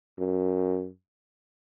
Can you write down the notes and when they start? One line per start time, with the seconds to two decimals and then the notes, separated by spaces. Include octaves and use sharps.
0.19 F#2